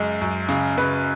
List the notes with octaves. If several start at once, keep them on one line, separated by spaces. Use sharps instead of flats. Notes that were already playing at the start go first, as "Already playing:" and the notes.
Already playing: F#2 C#3 G#3
F#2
C#3
C#3 B4